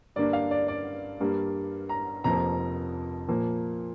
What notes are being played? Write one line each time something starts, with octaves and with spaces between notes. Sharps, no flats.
G2 D3 A#3 D4 D5
F5
D5
D5
G2 G3 A#3
A#5
F1 F2 F3 A#3 A#5
A#2 F3 A#3